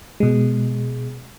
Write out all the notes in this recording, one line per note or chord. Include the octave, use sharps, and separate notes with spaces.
B2 G#3